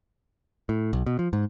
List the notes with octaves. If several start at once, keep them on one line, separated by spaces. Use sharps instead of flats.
A2
B1
B2
F3
G#2